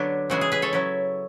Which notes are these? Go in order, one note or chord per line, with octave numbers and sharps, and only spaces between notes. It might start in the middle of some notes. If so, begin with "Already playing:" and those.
Already playing: D3 F#3 B3 D4
C#3 E3 G#3 F#4
G#4
G#4 B4
A4 C#5
F#3 C#4 E4